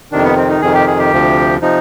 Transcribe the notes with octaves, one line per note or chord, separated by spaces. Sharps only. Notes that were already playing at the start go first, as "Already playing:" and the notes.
F2 C3 D#3 D4
B3
C4
D#4
F2 C3 D#3 G#4
G4
G#4
G4
D2 C3 F3
C3 F3 D#4